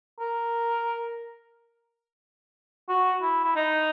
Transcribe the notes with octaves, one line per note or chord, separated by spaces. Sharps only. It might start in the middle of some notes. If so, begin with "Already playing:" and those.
A#4
F#4
E4
E4
D#4